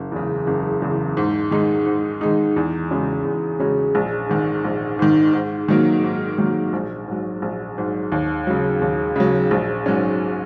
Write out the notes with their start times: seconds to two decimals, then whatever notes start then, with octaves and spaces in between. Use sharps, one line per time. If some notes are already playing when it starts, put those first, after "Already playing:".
Already playing: F#1
0.12 E2 C#3
0.47 F#1
0.82 E2 C#3
1.17 G#2
1.51 D#3 G#3 D#4
1.86 G#2
2.21 D#3 G#3 D#4
2.56 E2
2.90 C#3 G#3 C#4 F#4
3.25 E2
3.59 C#3 G#3 C#4 F#4
3.95 A#1
4.29 G#2 D#3
4.64 A#1
4.99 G#2 D#3
5.33 G#2
5.68 D#3 F#3 A#3
6.03 G#2
6.38 D#3 F#3 A#3
6.73 A#1
7.08 G#2 F#3
7.42 A#1
7.78 G#2 F#3
8.12 D#2
8.47 C#3 F#3
8.81 D#2
9.16 C#3 F#3
9.51 A#1
9.86 G#2 F#3 C#4